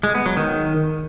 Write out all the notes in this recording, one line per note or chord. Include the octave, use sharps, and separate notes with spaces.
G#3
B3
F#3
D#3